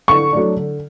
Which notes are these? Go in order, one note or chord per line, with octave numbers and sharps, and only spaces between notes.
D3 C#6
F#3 A3 D4
D3